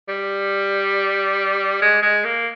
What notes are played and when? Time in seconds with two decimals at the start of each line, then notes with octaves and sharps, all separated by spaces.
0.09 G3
1.82 G#3
2.03 G#3
2.25 A#3